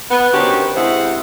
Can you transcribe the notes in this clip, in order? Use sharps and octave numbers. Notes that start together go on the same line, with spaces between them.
B3
D3 D#3 C#4 F#4 G4 C5
C3 G#3 E4 G#4 C5 F#5